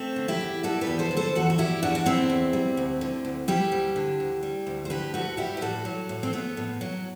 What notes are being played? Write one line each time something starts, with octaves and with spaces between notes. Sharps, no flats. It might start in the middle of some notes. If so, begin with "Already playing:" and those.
Already playing: A3 C4
D3
E4 G4
E2
G3 F#4 A4
G4 B4
E2
A4 C5
D3
A4 C5
E2 F#4 A4
F#4
G3 E4 G4
E2 D4 F#4
F#4
D3 C4 E4
E2
G3
D2
D3
D2
G3 E4 G4
D2
D3
D2
G3
D2
C5
D3 G4 B4
D2 F#4 A4
G3 E4 G4
B4
A2 F#4 A4
F#3
A2
C4
A3 B3
A2
F#3